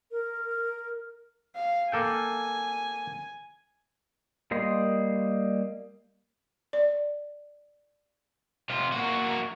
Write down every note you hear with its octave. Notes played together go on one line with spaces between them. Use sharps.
A#4
F5
A#3 A4 G5 G#5
G3 A#3 D#5 C6
D5
C3 F4
A#3 F#4